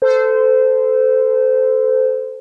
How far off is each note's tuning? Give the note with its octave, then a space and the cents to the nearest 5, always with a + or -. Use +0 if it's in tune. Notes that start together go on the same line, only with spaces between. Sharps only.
A4 +0 C5 -20